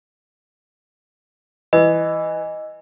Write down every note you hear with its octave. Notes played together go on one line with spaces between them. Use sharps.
E3 D#5